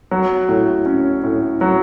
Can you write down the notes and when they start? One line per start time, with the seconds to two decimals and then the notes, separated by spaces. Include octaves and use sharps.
0.11 F#3
0.49 A2
0.86 C#4
1.24 A2
1.61 F#3